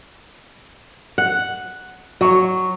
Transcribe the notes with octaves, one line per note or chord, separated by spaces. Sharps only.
F#5
F#3 C#5